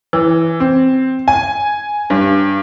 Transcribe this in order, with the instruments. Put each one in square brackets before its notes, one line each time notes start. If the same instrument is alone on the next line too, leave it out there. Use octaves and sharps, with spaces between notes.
[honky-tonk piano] E3
C4
G#5
G2